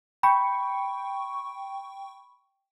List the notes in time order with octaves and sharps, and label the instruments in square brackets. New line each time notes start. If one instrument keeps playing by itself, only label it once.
[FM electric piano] G5 C#6 [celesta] B5